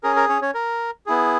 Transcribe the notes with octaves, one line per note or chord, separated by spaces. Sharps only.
C#4 G#4 A#4
A#4
C#4 C#5
C#4 C#5
A#4
B3 E4 G#4